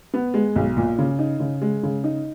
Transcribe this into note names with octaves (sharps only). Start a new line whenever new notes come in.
B3
G#3
B1
A#2
C#3
D#4
C#3
G#3
C#3
D#4